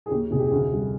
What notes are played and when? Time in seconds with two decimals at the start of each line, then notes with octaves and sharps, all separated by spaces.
0.06 G#4
0.10 D#2 G4
0.31 F1 G#4
0.39 G4
0.46 G#4
0.52 D2
0.72 G3